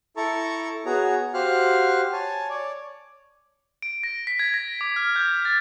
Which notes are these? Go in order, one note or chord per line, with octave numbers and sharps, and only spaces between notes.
E4 A4 A5 A#5 C#6
B3 F#4 G#4 C#5 A#5
F#4 G4 C5 F5 F6 F#6
C#5 G#5 A5
C#5 D5
D7
A#6
B6
G#6
A#6
D6
F6
G6
A6